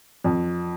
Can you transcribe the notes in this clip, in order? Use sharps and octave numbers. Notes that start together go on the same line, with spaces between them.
F2